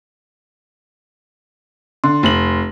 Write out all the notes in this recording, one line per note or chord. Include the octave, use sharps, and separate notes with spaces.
D3 C6
F1 F#7